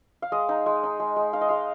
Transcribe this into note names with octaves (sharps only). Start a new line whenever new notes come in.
F5
G#3 D#5
D#4
G#3
D#4
G#3
G#3
D#4 F5
D#5
G#3 F5